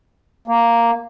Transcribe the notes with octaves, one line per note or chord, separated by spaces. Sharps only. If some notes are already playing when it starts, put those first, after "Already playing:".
A#3